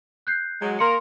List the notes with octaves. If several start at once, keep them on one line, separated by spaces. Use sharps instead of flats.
F#6 G6 C7
F#3 G#3
A#3 A#4 C6 C#7